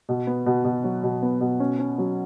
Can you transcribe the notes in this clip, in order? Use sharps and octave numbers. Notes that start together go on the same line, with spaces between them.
B2
B3
B2
B2
F#3
B2
B3
B2
C#4
C#4
F#3